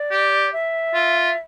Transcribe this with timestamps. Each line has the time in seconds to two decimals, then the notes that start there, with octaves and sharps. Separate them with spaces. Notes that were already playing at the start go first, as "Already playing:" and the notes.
Already playing: D5
0.11 G4
0.52 E5
0.94 F4